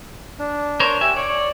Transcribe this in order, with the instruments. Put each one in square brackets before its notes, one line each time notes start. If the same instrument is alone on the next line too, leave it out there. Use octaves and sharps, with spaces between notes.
[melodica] D4
[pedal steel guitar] A#4 C5 C#5
[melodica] G4 [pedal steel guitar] E5 G#5
[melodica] C#5 [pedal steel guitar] D5
[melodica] C#5